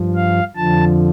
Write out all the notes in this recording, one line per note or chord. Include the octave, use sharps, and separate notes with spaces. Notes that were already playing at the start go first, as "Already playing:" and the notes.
Already playing: G2 F3
F5
F2 D3 F3 A5